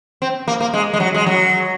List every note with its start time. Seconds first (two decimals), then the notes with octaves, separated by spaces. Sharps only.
0.22 C4
0.48 A#3
0.61 A#3
0.74 G#3
0.93 G#3
1.00 F#3
1.14 G#3
1.26 F#3